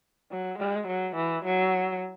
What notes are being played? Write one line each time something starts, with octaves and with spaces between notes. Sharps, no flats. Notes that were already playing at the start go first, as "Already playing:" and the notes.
F#3
G#3
F#3
E3
F#3